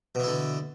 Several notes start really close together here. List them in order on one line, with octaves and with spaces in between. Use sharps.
B2 E3 E4 D3